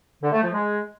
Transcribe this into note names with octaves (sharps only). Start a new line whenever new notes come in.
D3
A3
F3
G#3